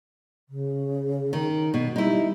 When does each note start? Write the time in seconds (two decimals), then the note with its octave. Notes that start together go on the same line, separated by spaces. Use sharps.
0.49 C#3
1.33 D#3
1.74 B2
1.96 G3 D#4 E4